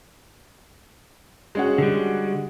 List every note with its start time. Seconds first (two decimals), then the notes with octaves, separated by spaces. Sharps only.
1.55 G#3 C#4 F#4
1.78 D3 G3